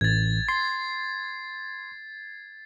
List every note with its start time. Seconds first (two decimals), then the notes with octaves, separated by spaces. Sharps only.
0.01 A1 G#6 A6
0.48 C6 C7